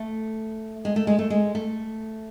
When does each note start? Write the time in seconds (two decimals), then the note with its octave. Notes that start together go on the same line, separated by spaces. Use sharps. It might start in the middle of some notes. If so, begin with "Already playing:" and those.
Already playing: A3
0.85 G#3
0.96 A3
1.07 G#3
1.19 A3
1.30 G#3
1.55 A3